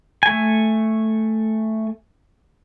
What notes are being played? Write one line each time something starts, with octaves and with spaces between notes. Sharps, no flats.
A3 G#5